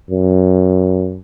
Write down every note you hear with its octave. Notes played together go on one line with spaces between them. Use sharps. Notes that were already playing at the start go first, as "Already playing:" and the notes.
F#2